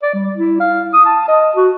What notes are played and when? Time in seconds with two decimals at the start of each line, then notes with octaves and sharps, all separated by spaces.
0.03 D5
0.14 G3
0.36 E4
0.60 F5
0.93 D#6
1.05 A5
1.28 D#5
1.56 F#4